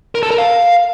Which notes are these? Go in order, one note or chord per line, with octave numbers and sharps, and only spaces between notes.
A#4
A4
A#4
F5